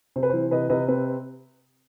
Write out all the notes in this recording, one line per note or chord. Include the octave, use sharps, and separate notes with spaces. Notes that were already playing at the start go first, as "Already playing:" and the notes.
C3 C5
B4
E3 C5
C3 B4 D#5
C3 B4 D#5
C4 B4